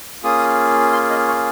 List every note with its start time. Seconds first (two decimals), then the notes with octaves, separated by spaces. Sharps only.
0.23 A#3 C#4 F4 G#4 D#6
0.93 C6
1.10 D#5
1.28 C#5